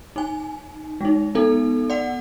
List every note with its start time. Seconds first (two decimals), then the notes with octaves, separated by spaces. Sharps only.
0.16 D#4 G#5
1.01 G#3 D#4
1.35 B3 D#4 A4
1.90 D5 F#5